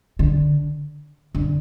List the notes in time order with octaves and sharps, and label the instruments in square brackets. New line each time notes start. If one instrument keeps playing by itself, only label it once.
[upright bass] D3
D3